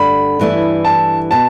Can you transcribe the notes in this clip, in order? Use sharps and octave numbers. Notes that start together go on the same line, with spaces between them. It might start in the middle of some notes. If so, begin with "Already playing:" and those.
Already playing: G2 D3 A3 D4 B5
G2 E3 A3 E4
A5
B2 A5